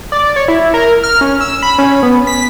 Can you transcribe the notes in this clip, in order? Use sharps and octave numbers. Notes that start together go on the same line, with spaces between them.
D5
C#5
E4
A#4
F6
C#4
E6
B5
C#4
B3
B6